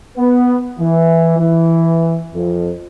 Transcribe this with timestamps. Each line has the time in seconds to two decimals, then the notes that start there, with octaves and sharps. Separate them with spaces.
0.17 B3
0.79 E3
1.38 E3
2.34 F2